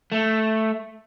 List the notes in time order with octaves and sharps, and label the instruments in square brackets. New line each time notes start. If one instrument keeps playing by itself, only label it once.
[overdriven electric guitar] A3